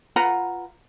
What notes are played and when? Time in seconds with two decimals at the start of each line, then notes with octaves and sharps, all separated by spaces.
0.16 F4 B4 F#5 A#5